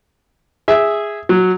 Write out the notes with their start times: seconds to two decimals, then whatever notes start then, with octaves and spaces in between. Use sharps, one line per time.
0.68 G#4 E5
1.29 F#3